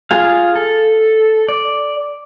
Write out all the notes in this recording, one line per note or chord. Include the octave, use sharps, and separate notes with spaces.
F4 G#4 F5
A4
D5